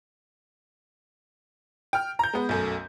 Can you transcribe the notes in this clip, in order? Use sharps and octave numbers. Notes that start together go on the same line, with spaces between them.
G5 F6
A#5 G6
G#3 B3
B1 F#2 A3